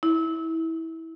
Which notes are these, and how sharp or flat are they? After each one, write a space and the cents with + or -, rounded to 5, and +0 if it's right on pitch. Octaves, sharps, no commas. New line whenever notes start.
E4 -20